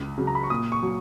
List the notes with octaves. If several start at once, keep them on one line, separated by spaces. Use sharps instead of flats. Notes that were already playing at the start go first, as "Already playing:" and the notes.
Already playing: C#2
C#3 F#3
A#5
B5
C#6
A#2 D#6
C#6
F#3